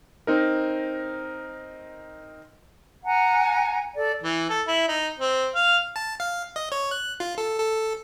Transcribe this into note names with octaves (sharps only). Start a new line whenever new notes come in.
C4 D#4 A#4
F#5 G#5 A#5
A4 D5
E3
A4
E4
D#4
C4
F5
A5
F5
D#5
C#5
F#6
F4
A4
A4